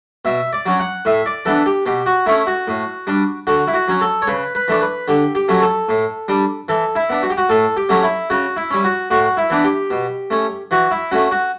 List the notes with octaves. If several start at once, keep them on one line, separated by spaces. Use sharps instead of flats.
B2 E5
D5
F#3 C#4
F#5
A2 E5
D5
E3 B3 D4 A4
G4
B2 G4
F#4
A3 C#4 E4
F#4
A2
G3 D4
D3 F#4
E4
F#4
F#3 C#4
A4
C#5
C#3 B4
B4
E3 A3 D4
B4
D3 G4
G4
F#3 A3 C#4
A4
A2
G3 D4
E3 A4
E4
B3 D4
F#4
G4
F#4
A2 A4
G4
F#3 A3 C#4
E4
C#3 F#4
E4
G3 C#4
F#4
A2 F#4
E4
E3 B3 D4
G4
B2
A3 C#4
E3 F#4
E4
A3 C#4 F#4
F#4